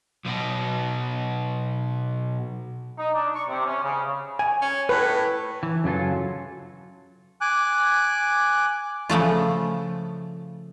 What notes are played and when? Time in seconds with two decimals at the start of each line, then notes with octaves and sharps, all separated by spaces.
0.25 B1 B2
2.98 D#4
3.14 D4
3.34 C#6
3.49 C3
3.66 C#4
3.83 C#3
4.39 G#5
4.62 C#4
4.89 A2 B4
5.63 E3
5.84 F#2 C#3 F#3 F4 A4
7.41 G#5 D6 F#6
9.10 C#3 F3 A3 F4